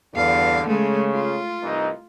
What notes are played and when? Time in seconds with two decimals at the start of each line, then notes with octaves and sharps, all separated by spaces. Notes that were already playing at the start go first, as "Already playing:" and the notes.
0.15 E2 G2 D3 F5
0.67 C#3 G#3 A3
1.14 F4
1.63 C2 E3 D#4